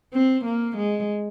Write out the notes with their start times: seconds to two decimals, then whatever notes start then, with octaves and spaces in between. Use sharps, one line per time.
0.14 C4
0.45 A#3
0.77 G#3